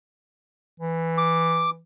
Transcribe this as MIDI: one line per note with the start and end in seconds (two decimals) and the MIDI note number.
0.80 1.83 52
1.18 1.70 86